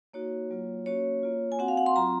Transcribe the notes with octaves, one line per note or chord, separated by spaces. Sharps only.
A#3 D#4 F#4 C#5
F#3 A#3 F4
A#3 C#4 F#4 C#5
A#3 F4
G#5
C4 F#4 F#5
F5
F#5
C6
F#3 C4 F4 A#5